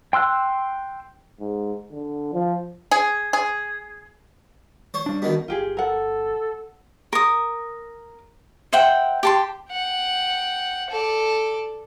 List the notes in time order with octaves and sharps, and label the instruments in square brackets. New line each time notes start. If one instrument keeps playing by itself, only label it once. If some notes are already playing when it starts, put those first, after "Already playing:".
[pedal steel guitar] G5 C6 E6 F#6
[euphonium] G#2
D3
F3
[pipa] G#4
G#4
[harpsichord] C5 C#5
[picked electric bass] G3 D4
[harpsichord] B2 D#3
[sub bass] G1 [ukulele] F4 G4 G#4
[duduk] A4 [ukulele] A#4 F#5
[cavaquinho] A#4 D#6
C5 E5 F#5 G5
G4 A5 C6
[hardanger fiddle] F#5 G5
A4 D5